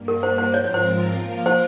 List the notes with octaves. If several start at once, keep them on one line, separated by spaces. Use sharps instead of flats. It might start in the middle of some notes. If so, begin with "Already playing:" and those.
Already playing: G2 G3 A#3
A#4
C5
C5
G#2 F3 C4 F4 A#4 C#5
C#5
C5
F3 A#3 F4 A#4
C5